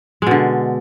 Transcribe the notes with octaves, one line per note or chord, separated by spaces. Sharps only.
B2 D3 G#3